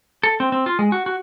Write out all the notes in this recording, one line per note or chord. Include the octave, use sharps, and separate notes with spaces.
A4
C4
C4
F4
G#3
F#4
F#4